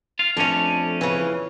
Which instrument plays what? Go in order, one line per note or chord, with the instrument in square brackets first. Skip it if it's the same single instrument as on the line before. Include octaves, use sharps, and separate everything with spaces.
[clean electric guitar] F4
[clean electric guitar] F2 C#4 [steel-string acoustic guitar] A3 D4
[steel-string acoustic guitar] C#3 E3